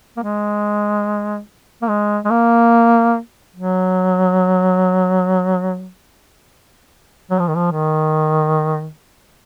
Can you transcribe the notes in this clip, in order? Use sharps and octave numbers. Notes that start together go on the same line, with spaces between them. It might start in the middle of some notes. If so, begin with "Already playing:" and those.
A#3
G#3
A#3
G#3
G#3
A#3
F#3
F#3
F3
D#3
F3
D#3